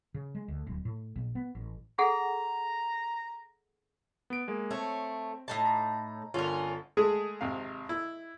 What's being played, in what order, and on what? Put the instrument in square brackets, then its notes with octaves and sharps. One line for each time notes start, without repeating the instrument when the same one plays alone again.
[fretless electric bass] C#3
G#3
D2
D1
A2
A#1
B3
A1
[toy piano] G#4 A4 F#5 [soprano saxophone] A#5
[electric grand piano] B3 D7
G#3 A#3
[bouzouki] A3 C#5 [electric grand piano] C4
[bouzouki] A2 D#4 A5
[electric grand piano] A#5
[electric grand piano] G1 D3 F4 [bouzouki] C#4 A#4
[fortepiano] G#3 A3 G#4
G#1 C3 F5
E4